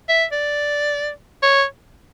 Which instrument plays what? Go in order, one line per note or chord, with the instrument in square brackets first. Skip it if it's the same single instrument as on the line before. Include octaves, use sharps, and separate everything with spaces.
[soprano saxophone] E5
D5
C#5